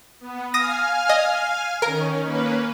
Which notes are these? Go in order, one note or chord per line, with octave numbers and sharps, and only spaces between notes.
B3
F5 G#5 D#6 F6 A#6
D#5
D#3 C#4 A#4
A#3 C#4 B4